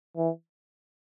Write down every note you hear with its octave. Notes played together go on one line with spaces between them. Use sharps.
E3